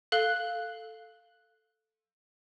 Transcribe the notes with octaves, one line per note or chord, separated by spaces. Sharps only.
A4 F5 F#6 G7